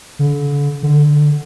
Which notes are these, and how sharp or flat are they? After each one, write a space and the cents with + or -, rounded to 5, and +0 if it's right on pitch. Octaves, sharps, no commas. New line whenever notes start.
D3 -35
D3 +10